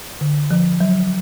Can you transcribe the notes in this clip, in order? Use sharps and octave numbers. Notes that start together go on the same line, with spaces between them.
D3
F3
F#3